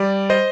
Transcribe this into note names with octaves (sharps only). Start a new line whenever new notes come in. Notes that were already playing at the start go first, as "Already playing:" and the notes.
Already playing: G3 D5
C5 D#5